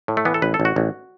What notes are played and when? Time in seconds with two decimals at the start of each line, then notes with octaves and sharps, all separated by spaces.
0.08 A2
0.17 A3
0.25 E3 B3
0.34 A4
0.42 A1 B4
0.54 A4
0.60 A1
0.65 F#4
0.76 A1